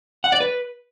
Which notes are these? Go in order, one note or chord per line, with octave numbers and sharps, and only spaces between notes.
F#5
D5
B4